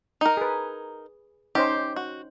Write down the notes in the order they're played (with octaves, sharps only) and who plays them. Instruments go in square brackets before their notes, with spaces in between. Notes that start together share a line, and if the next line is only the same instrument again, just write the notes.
[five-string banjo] D#4 A#4
[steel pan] G#4 B4
[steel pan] C#4 D#4 C5 [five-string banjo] G4
[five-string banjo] F#4